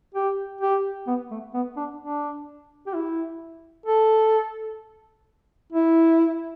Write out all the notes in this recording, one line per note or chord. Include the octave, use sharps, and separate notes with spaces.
G4
G4
B3
A3
B3
D4
D4
G4
E4
A4
E4